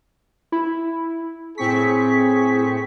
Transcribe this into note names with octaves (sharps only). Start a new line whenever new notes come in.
E4
A2 C4 G#4 C#6 B6